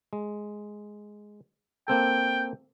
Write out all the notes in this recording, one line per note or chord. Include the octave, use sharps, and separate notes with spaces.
G#3
A#3 C4 A4 G5